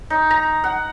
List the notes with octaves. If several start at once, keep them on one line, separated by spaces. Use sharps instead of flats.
D#4
A#5
F#5